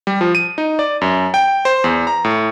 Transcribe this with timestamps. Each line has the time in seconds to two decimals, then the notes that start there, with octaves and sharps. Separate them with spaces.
0.07 G3
0.21 F3
0.35 D#7
0.58 D#4
0.79 D5
1.01 F#2
1.34 G5
1.65 C5
1.84 E2
2.07 A#5
2.24 A2